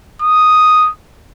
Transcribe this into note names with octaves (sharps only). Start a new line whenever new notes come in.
D#6